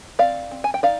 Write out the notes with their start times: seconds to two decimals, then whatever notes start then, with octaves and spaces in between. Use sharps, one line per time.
0.19 C4 D5 F5
0.51 C4
0.64 G#5
0.74 G5
0.83 D#4 D5 F5